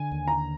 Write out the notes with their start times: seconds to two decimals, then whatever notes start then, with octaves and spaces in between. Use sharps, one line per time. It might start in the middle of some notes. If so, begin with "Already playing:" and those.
Already playing: D3 G#5
0.12 D#2
0.28 A#5